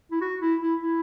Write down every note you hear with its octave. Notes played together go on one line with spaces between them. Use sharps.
E4
F#4
E4
E4
E4